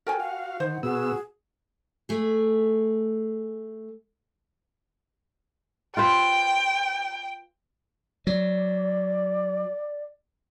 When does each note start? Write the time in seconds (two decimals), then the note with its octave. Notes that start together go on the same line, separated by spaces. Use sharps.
0.07 F#4 A4 A#4 G5 G#5
0.20 F#4 F5 F#5
0.60 D#3 C5
0.83 B2 B3 F#4 G#4 E6
2.09 A3 G#4
5.97 F4 B4 C5 G5
8.27 F#3 D5